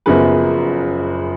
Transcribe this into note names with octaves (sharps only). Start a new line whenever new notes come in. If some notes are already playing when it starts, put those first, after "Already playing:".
F#1 F#2 F3 B3 G#4 B4